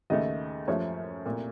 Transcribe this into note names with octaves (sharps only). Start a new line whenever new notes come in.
D#2 C#3 A3 D#5
F#2 F3 A3 C#5
C2 A#2 A3